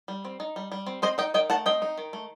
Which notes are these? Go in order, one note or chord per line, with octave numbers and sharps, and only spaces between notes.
G3
C4
D#4
G3
G3
C4
C4 C5 D#5
D#4 D#5 G5
D#3 D#5 G5
A3 F#5 A5
C4 D#5 G5
D#4
D#3
A3